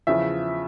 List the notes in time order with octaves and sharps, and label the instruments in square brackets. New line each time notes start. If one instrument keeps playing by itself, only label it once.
[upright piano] E2 C#3 F3 E5